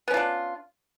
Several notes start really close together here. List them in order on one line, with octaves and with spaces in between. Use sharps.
B3 C#4 F4 D4